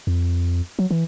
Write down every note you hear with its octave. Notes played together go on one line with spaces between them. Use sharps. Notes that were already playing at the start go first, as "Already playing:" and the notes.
F2
F#3
E3